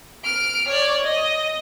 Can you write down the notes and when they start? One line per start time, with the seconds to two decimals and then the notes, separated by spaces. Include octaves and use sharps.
0.24 F6 D7
0.68 C#5 D5
1.05 D#5